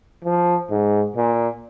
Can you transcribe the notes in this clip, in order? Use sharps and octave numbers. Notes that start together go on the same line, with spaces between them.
F3
G#2
A#2